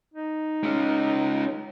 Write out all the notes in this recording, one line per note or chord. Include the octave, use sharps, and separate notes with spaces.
D#4
G#3 C#4